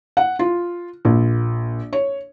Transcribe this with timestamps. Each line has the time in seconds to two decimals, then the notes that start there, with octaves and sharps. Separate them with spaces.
0.17 F#5
0.39 F4
1.05 A#1
1.93 C#5